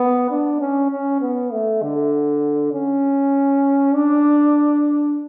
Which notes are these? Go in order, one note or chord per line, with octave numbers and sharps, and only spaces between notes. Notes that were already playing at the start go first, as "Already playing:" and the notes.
Already playing: B3
D4
C#4
C#4
B3
A3
D3
C#4
D4